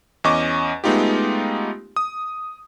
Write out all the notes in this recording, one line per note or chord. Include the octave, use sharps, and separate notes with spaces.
E2 C#4 D#5 C#6 D6
G#3 A3 B3 D#4 F4 G4
D#6